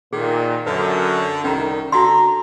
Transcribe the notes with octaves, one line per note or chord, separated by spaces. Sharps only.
A#2 D#3 G#4
F#2 D3 B4
C2 D#3 C#4 A#4 A#5
D3 F#4 A#5 C6